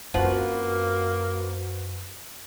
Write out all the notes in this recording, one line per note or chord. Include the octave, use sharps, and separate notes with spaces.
F#2 F3 A#3 C4 F#4 B4 C5 F#5